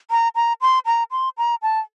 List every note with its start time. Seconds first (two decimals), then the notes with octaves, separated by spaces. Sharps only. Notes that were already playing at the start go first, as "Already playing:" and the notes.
0.11 A#5
0.35 A#5
0.61 C6
0.86 A#5
1.11 C6
1.38 A#5
1.62 A5